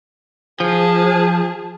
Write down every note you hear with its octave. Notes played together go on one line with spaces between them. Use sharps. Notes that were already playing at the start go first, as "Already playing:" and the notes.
F3 G#4 A5